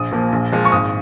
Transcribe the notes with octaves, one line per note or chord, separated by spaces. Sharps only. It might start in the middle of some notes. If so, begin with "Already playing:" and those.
Already playing: A#1 D#6
A#2 F3 A#3
A#1
A#2 F3 G#3
C#6
G#1 D#6